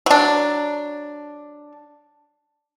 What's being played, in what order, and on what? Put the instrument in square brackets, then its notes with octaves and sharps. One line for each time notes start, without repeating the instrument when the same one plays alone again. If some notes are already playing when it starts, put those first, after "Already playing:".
[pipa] F#3 D4